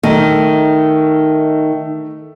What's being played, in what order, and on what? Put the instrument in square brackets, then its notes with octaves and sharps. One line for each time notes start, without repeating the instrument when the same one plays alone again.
[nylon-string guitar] D#3 [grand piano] A3